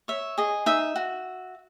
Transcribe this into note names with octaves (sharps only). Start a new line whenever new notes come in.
C#5 E5
G#4 D#5
D#4 E5
F#4